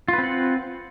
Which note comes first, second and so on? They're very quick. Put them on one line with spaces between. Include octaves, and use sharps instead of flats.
F4 B4 C4 F#5